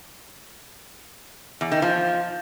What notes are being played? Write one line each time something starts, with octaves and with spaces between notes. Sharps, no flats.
E2
D#3
F3